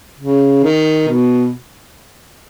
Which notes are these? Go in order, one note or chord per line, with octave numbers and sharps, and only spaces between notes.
C#3
D#3
B2